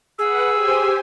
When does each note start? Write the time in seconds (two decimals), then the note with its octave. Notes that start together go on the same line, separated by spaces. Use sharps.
0.19 G#4 B4 F#5 E6
0.53 G4 C5 G#5